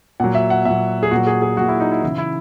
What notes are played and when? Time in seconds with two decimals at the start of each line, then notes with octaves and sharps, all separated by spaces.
0.20 A#2 F#3 F#5
0.35 E5
0.50 F#5
0.65 A#2 F#3 E5
1.03 G#4
1.11 A#2 F#3 F#4
1.27 G#4
1.42 G#4
1.57 F#3 F#4
1.60 A#2
1.68 E4
1.80 D#4
1.91 E4
2.03 C#3 E3 E4
2.18 E4